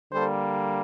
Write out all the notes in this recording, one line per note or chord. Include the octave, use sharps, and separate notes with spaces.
D3 G3 A#3 A4 C5